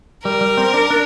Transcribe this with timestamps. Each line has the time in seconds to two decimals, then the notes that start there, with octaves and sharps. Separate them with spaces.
0.24 G3 A#4
0.41 G3
0.58 C4
0.74 D4
0.90 D4